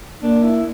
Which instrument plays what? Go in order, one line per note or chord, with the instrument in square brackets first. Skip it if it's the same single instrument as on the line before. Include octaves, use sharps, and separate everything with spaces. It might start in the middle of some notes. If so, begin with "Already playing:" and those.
[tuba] A#3 [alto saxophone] D4
[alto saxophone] E4